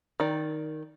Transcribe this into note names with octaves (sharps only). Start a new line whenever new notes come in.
D#3 D5